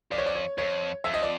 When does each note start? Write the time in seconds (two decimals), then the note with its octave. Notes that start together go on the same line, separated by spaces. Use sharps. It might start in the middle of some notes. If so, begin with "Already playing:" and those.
0.11 F2 D5
0.18 C#5
0.26 D5
0.35 C#5
0.58 F2 C#5
1.04 F2 E5
1.14 D#5
1.22 D5